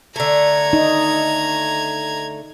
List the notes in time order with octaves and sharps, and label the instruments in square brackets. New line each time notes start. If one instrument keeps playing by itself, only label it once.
[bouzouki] D3 A3 [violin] A#5 G#6
[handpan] D#4